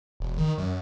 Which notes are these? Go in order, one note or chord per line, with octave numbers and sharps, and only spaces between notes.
E1
D#3
F#2